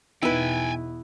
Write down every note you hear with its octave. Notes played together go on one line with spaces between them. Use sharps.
E2 B2 B3 D#4 E4 B4 G5 G#5